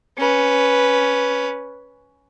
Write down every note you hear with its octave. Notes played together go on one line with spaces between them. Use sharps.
C#4 B4